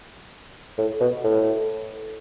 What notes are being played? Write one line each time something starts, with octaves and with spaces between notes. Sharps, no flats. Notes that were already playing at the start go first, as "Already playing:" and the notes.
A2
B2
A2